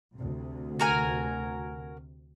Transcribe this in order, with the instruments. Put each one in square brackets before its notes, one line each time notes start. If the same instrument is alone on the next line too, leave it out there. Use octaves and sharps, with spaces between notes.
[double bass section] D2 C3
[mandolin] F#4 A#4 G#5